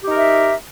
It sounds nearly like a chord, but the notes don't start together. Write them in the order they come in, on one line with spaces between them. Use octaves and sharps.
G4 D#4 A#4 E5